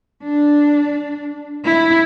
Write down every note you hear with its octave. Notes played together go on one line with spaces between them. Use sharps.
D4
E4